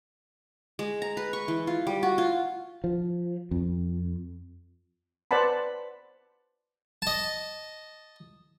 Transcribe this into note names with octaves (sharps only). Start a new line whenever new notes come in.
G#3
A#5
B4
C#6
E3
F4
G3
F#4
F4
F3
F2
B4 C5 D5 F#5 A5 B5
D#5 A5